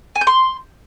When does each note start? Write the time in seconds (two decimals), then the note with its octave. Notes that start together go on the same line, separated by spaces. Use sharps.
0.16 G#5
0.21 G6
0.27 C6